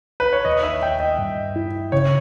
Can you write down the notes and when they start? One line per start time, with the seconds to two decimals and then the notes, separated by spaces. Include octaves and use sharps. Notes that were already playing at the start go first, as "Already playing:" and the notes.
0.20 B4
0.33 C#5
0.45 D#2 D#5
0.63 E5
0.81 D#2 G5
1.00 D#5
1.19 G2
1.56 E4
1.92 C#3 C#5